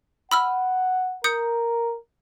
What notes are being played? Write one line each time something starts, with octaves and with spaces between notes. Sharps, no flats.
F#5 B5 E6 F6
A#4 D#6 G6 C#7